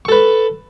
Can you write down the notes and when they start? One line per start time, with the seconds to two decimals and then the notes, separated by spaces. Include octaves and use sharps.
0.05 C#6
0.09 A4
0.12 B4